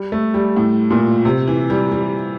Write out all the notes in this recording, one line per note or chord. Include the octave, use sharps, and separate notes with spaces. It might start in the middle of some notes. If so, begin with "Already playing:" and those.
Already playing: G3
A3
G3
A2
A#2
C3
E3
G3
G3